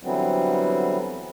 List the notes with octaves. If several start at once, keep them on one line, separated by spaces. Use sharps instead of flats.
D3 E3 F#3 G3 B3 C4